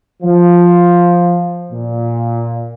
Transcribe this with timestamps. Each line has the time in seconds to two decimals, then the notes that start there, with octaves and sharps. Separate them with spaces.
0.23 F3
1.72 A#2